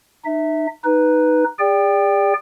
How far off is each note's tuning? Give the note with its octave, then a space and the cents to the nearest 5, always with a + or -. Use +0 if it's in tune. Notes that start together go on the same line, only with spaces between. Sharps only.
D#4 -35 E5 -15
D#4 +0 B4 +0
G#4 -45 D5 -10 G5 +10